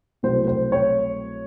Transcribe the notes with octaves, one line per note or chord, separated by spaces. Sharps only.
C2 B2 F#3 A3 C5
C5
C#5